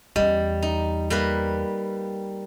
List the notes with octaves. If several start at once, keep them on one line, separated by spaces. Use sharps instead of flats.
E2 G3 C#4 D#5
D#4
G3 A#3 B4